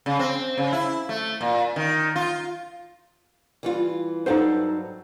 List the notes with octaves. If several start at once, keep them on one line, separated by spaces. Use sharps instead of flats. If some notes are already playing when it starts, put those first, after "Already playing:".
C#3
C4
C#3
E4
A3
A#2
D#3
F4
E3 G3 F4
G2 F#3 D#4 A4 C5 F5